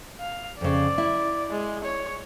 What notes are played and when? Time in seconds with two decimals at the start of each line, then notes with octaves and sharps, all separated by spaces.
0.20 F5
0.61 F2 C#3 D5
0.98 E4
1.50 G#3
1.84 C#5